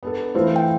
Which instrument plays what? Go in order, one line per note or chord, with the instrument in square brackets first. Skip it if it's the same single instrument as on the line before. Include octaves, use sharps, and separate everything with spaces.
[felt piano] B3 D4 A4
E3 A3 C4 F4 C5
[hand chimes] G5